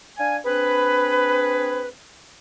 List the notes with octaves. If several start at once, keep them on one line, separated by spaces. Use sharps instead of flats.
D4 F5 G#5
C4 D4 G#4 B4